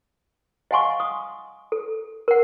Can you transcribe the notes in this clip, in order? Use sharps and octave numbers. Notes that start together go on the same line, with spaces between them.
D#5 F5 F#5 G#5 C6 C#6
D#6
A4
A#4 F#5